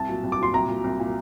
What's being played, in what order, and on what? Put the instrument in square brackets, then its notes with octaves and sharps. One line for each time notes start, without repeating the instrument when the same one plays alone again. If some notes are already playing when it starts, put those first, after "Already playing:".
Already playing: [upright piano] C2 [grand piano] A5
[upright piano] A#2 F#3
C2
[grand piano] D6
[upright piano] A#2 F#3 [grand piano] C6
[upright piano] C2 [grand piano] A#5
[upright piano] A#2 F#3
C2
A#2 F#3